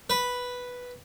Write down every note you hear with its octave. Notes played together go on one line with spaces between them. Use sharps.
B4